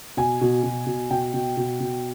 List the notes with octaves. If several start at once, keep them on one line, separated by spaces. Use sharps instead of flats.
B2 G#5
B2
B2
B2
B2 G5
B2
B2
B2